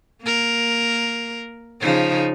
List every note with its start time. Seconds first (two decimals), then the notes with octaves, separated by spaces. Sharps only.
0.23 A#3 A#4
1.81 C#3 F3 D#4